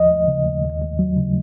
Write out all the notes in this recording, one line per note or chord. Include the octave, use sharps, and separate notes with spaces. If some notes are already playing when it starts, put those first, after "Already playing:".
Already playing: D#2 F3 D#5
D#2
C#3
D#2
D#2
D#2
F#3
C#3